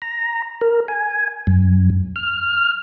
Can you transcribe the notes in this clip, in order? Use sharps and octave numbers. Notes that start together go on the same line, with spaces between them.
A#5
A#4
G#5
F#2
F6